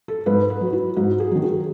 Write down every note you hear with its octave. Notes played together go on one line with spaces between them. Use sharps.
A4
G#2 B4
B4
F#3
E4
G#2 F#4
G#4
D#3 F#3
G#4